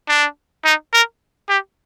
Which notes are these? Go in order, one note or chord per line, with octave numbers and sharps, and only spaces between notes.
D4
D#4
A#4
G4